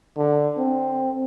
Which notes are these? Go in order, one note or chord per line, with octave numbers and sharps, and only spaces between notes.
D3
C4